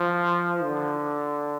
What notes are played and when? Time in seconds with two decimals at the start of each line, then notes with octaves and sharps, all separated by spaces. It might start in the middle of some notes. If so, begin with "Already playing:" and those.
Already playing: F3
0.63 D3